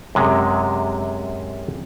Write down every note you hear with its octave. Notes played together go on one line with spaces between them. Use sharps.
F#2 C3 G#3